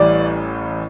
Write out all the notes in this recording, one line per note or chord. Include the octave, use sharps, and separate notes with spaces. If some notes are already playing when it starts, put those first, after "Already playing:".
Already playing: A1 A2 E3 G3 D5